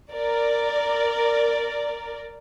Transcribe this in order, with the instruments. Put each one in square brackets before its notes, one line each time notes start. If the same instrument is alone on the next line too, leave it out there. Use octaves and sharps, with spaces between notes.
[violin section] A#4 D5